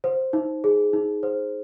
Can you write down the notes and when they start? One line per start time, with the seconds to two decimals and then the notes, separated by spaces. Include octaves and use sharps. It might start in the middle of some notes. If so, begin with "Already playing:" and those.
0.04 C5
0.33 D#4
0.64 G#4
0.93 D#4
1.23 C5